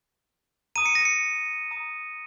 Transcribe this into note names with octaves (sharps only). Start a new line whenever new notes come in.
A#5 D#6 D#7
C#7
A#6
C#7
A#5 D#6